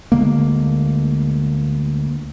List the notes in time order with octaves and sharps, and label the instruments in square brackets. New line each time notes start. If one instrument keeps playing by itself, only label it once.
[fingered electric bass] D2 D3 G#3 A#3